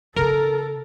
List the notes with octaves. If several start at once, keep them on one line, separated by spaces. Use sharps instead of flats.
C#3 F4 A4 A#4